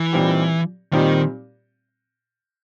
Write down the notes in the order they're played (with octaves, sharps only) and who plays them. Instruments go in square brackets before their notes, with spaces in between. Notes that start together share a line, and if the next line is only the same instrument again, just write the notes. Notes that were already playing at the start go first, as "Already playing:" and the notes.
Already playing: [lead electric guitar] E3
[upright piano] A#2 G3 C4 D#4 G4
[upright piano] A#2 G3 C4 D#4 G4 [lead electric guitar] D#3